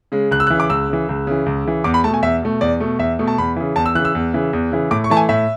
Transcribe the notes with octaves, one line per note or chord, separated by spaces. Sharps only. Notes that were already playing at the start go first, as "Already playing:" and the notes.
C#3 G#3
C#2 F#6
E6
F#6
C#3 E3
D6
C#2 E6
C#3 E3
C#2
C#3 E3
C#2
C#3 E3
E2 D6
B5
B2 A3 A5
G#5
E2 E5
B2 A3
E2 D5
B2 A3
E2 E5
B2 A3
A5
E2 B5
C#3 E3
E2 A5
E6
C#3 E3 F#6
E6
E2
C#3 E3
E2
C#3 E3
A2 D6
C#6
E3 A3 A5
G#5
A2 E5